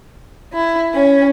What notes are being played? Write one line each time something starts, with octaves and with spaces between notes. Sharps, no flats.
E4
C#4